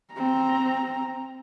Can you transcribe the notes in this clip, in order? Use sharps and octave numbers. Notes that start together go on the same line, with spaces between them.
C4 A#5